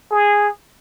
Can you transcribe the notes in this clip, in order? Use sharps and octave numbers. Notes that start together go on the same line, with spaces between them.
G#4